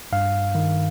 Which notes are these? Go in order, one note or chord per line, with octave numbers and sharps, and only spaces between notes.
G2 F5
D#3